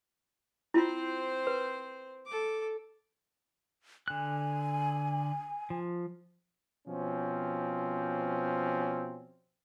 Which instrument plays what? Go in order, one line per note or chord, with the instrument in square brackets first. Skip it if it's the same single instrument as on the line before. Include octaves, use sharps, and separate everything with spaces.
[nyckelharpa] C4 C5 [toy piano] E4 F4
[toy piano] B4
[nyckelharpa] A4 D6
[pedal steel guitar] D3 F#6 [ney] G#5
[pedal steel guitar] F3
[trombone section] B2 F3 C4 C#4